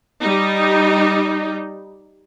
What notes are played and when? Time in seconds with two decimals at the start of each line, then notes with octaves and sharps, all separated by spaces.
0.21 G3 D#4